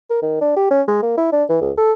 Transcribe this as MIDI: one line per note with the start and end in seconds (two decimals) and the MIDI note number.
0.10 0.19 70
0.22 0.41 51
0.41 0.54 62
0.56 0.69 67
0.71 0.82 61
0.88 0.98 56
1.03 1.13 58
1.18 1.28 64
1.33 1.44 62
1.50 1.57 52
1.61 1.72 37
1.77 1.93 69